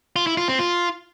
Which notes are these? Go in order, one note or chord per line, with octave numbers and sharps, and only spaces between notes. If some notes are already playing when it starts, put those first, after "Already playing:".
F4
E4
F4
C4
F4